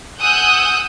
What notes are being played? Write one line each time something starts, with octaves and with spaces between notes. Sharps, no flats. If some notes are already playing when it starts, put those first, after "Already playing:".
F#5 G#5 D#6 E6 F#6 G6